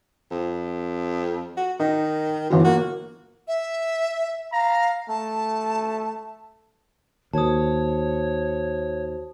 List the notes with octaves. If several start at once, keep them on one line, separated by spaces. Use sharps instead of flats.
F2
F#4
D#3 D#4
G1 F#2 E3 F#3
A#3 F#4
E5
F5 A#5
A3 A5
D#2 F#4 C5 C#5 A5 D#6